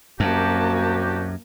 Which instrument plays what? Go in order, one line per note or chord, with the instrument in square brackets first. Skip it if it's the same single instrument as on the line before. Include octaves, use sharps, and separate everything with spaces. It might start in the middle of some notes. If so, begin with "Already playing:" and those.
[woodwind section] C2 F#4 G4 [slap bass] F#2 [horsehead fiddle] A#3 A5